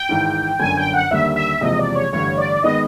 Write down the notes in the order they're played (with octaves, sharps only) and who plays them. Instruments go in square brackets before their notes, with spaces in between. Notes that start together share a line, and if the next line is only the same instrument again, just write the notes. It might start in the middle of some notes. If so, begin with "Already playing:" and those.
Already playing: [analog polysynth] G5
[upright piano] G#1 G#2 E3
[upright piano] G1 F#2 D3 [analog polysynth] G#5
[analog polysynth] G5
F#5
[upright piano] D#2 D3 G3 A#3 [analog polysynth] E5
[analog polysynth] E5
[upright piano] F#1 E2 C3 F3 G#3 [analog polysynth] D#5
[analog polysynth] D5
C#5
[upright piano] A1 G2 D3 [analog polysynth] C#5
[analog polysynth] D5
[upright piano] D#3 G#3 B3 [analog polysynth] D#5